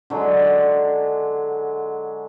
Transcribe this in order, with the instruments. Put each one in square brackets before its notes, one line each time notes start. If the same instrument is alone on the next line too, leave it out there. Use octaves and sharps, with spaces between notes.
[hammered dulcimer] D3 F#3 G#3